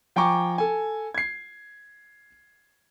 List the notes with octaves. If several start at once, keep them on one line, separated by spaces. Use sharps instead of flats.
F3 G5 G#5 A#5 C#6 D6
A4 G#5
G#6 C7